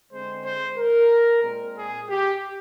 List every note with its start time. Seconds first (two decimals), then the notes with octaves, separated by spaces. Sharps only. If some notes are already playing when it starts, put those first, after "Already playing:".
0.10 D3 G#3 C4 C5
0.44 C5
0.77 A#4
1.43 A#2 G#3 C4
1.77 G#4
2.09 G4